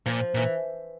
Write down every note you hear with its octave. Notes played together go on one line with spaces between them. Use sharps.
A#2 F3
A#2 E3